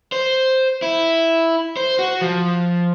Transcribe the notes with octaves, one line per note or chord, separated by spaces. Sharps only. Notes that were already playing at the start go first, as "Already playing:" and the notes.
C5
E4
C5
F#4
F3